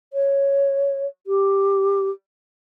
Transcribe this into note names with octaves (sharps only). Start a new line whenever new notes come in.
C#5
G4